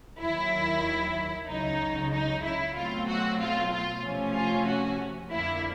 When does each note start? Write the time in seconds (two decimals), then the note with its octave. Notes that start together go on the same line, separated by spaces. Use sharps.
0.19 D#2 D#3 F#3 E4
1.47 C#2 C#3 F#3 D#4
2.11 D#4
2.43 E4
2.74 B2 F#3 A3 C4 F4
3.07 F#4
3.38 F4
3.71 F4
4.02 C3 F3 A3 C#4
4.34 F4
4.66 F#4
5.31 F2 D3 F3 A#3 E4